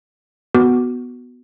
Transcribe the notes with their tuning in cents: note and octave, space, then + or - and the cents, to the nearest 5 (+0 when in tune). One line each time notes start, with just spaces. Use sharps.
B3 +0 F#4 +0 D6 -5